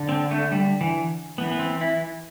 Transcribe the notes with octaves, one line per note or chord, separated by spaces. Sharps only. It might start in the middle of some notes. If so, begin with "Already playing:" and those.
Already playing: D3
C4
A3
G3
E3
E3 B3
B3
C4
E4